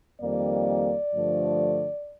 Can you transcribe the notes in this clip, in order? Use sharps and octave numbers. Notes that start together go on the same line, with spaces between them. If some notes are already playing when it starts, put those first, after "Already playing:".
F2 D#3 G3 A#3 D5
G2 D3 F3 A3